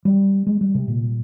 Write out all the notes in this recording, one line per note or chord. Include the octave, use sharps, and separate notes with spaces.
G3
G#3
G3
C3
A#2